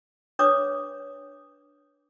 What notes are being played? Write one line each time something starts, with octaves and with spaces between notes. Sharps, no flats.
D4 B4 C#5 D6 D#6